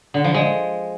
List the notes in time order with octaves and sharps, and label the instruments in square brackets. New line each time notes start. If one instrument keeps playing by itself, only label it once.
[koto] D3
F3
G#3